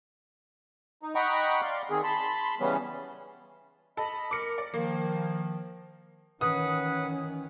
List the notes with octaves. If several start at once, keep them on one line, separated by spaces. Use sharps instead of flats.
D#4
D#5 F#5 G5 A#5 B5 C#6
D5 F5 C6
D#3 C4 G#4
A5 B5 C6
C#3 E3 G3 B3 C#4
A4 D#5 B5
A#4 D6 C#7
D5
D#3 F3 A#3
D#3 E3 C#4 B4 F#5 D#6